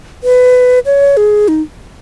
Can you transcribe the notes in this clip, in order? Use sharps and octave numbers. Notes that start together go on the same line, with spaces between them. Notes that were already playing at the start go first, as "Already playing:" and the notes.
B4
C#5
G#4
D#4